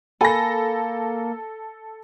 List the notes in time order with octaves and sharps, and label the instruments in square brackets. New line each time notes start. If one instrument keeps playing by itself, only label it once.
[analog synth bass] A#3 [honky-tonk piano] A4 A#6 [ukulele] G#5 B5